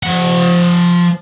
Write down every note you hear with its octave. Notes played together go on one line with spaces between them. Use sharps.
F3 F#5